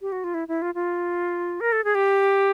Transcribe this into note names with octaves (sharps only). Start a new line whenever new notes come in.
G4
F#4
F4
E4
E4
F4
F4
A#4
A4
G#4
G4